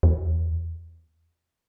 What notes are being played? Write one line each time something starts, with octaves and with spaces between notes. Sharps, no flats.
E2